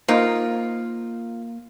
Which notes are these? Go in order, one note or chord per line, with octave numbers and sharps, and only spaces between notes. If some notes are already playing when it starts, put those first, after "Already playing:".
A#3 D#4 F4 A#4 C5